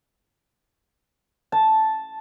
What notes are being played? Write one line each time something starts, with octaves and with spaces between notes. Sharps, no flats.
A5